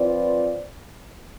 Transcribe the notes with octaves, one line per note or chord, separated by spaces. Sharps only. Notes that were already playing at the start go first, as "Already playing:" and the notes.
Already playing: F3 C4 F4 B4 D5